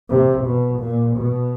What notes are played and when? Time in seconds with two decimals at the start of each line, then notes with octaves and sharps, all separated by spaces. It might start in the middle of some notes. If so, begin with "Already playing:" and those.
0.10 C3
0.45 B2
0.81 A#2
1.16 B2